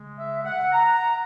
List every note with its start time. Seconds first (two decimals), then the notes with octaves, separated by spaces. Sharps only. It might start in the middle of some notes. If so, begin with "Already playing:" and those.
Already playing: C#3 G#3
0.18 E5
0.45 F#5
0.72 A#5